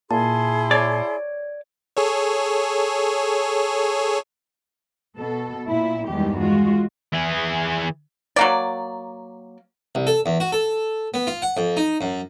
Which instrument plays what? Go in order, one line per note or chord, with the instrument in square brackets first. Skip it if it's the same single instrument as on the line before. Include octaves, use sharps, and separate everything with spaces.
[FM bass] A#2 [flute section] E4 G#4 C6 [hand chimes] A5
[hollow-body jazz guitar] C#5 D5
[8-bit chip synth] G#4 A4 C#5
[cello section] B2 A4
A#2 E4
E2 G2 D#3 E3 G#3 G4
G#3 F4 F#4
[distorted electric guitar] E3 G#4
[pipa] F#3 A#3 D5
[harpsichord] C2
A4
E2
F#4
A4
B3
F4
F#5
F2
D#4
F#2